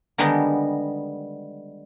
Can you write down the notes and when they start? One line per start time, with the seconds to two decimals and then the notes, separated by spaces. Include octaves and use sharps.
0.18 D3 D#3 G3 G#3 B3 D#4